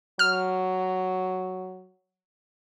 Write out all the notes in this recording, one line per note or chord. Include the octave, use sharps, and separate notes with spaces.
F#3 F6